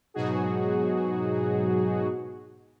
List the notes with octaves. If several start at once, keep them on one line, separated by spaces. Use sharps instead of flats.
G#2 B2 F#3 D#4 F#4 G#4